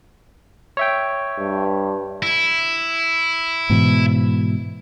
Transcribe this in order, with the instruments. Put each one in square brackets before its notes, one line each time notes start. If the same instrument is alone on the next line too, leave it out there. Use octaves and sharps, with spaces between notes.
[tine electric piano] C#5 E5 G5
[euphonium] G2
[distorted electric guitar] E4
[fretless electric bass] G#2 B2 E3